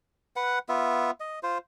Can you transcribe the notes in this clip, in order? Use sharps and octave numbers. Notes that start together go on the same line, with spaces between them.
B4 F#5
B3 F4 E5
D#5
F4 C5